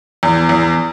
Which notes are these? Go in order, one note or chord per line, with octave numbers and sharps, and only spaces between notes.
E2
E2